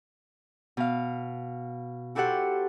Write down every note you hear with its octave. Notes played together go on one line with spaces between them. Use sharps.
B2 F5
E4 F#4 G4 A4 C5 F#5